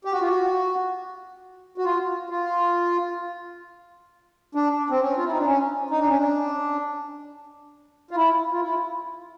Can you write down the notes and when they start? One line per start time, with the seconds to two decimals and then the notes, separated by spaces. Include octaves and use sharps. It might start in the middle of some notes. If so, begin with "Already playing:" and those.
0.05 G4
0.12 F#4
0.21 F4
0.28 F#4
1.78 F#4
1.85 F4
2.30 F4
4.55 D4
4.90 C4
5.01 C#4
5.18 F4
5.25 E4
5.31 D#4
5.38 D4
5.45 C#4
5.90 D#4
5.99 D4
6.08 C#4
6.18 D4
8.11 F4
8.16 E4
8.52 F4
8.61 E4